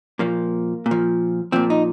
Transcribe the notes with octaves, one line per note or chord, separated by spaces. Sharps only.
A#2 F3 A#3
A#2
F3
A#2 F3 C4
D#4